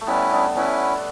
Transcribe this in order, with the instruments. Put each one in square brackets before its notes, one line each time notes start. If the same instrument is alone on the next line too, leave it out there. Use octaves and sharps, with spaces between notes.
[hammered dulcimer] A3
[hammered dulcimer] G3 B3 [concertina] C#4 E4 B4
[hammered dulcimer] B3 D4
[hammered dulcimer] B3 D4 [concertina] C#4 E4 B4